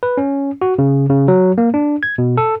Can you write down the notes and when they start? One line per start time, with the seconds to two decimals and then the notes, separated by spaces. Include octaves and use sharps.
0.03 B4
0.17 C#4
0.62 F#4
0.79 C#3
1.10 C#3
1.28 F#3
1.58 A#3
1.74 D4
2.03 G#6
2.18 B2
2.37 A4